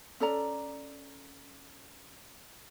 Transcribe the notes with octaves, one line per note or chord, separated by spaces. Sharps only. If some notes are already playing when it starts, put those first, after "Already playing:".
C#4 A4 D5 A#5